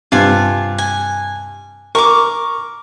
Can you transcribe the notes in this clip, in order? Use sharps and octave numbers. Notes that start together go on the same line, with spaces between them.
G2 C3 F4 G#5
G#5
A#4 C#6 D6